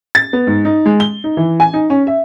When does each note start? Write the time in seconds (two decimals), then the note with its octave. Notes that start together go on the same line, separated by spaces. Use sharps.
0.15 A6
0.33 B3
0.47 G#2
0.65 D#4
0.86 G#3
1.00 G7
1.24 D#4
1.37 E3
1.60 G#5
1.73 D#4
1.90 C#4
2.07 E5